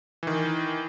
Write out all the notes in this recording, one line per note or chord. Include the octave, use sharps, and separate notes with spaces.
D#3 E3